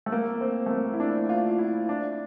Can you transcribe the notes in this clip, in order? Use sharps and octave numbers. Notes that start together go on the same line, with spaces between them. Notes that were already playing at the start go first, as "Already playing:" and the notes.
A3
A#3
C4
A3
A#3
E4
D4
F4
E4
D4